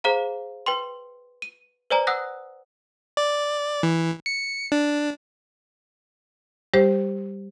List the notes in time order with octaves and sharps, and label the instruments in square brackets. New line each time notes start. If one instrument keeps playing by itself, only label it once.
[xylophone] G#4 C5 F5 A#5
B4 G5 C6
D#7
B4 C5 D5 G#5 A#5
F#5 D#6 E6 F#6 A#6
[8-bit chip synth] D5
E3
C#7
D4
[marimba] G3 G4 C5